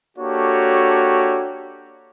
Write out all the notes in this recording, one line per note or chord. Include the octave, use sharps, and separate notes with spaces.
A#3 D4 F#4 G4 A4 C#5